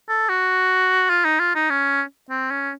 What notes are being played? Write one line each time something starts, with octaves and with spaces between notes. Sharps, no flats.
A4
F#4
F4
D#4
F4
D#4
C#4
C4
C#4